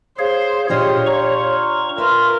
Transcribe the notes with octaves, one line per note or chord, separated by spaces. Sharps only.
G#4 C5 C#5 F5
A#2 D4 F4 G4 C#5 D#5
F4 A#5 C#6
F4 A#4 B4 E5